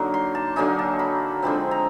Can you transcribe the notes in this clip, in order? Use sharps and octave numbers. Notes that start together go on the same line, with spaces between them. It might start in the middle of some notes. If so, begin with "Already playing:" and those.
Already playing: D3 F#3 A#3 D#4
C6
A5
D3 F#3 A#3 D#4 G#5
A5
B5
D3 F3 G#3 C4 B5
A#5